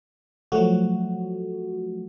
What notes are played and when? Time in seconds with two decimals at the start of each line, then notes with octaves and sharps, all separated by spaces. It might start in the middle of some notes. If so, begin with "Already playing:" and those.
0.52 F3 F#3 A3 F#4